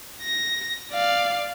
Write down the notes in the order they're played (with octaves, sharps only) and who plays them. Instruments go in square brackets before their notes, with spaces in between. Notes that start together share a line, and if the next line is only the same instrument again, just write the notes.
[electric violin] A#6
D5 F5